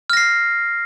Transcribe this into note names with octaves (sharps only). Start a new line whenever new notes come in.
F6 A#6 C7